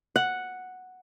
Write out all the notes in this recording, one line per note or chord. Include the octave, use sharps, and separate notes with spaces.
F#5